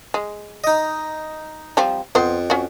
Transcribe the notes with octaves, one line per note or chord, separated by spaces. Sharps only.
G#3
D#4 D#5
F3 G3 C4
F2 B3 C5
C#4 F#4